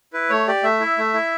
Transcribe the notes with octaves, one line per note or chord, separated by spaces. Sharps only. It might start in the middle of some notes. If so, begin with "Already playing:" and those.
E4 B4
A3 C#5
G4 D5
A3 E5
E4
A3
E4